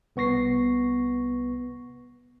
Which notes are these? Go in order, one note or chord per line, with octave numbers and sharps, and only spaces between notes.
C2 B3 C#6 A#6 C7